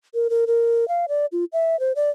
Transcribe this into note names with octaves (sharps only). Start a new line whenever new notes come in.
A#4
A#4
A#4
F5
D5
F4
E5
C5
D5